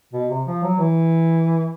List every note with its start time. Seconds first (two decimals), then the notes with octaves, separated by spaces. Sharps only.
0.13 B2
0.30 C3
0.47 F3
0.63 F#3
0.79 E3